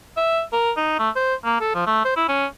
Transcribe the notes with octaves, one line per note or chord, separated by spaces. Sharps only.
E5
A#4
D#4
A3
C5
A#3
A4
F3
A3
C5
E4
C#4